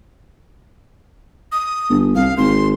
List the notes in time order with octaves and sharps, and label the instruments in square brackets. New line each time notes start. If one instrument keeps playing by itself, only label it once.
[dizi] D#6
[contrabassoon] G1
[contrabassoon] C2 [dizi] F5
[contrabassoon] G#1 [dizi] C6